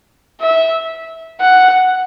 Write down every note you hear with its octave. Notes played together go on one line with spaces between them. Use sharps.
E5
F#5